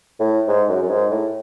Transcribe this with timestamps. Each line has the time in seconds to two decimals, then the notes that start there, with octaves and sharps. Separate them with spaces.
0.20 A2
0.48 G#2
0.69 F#2
0.83 F#2
0.90 G#2
1.11 A2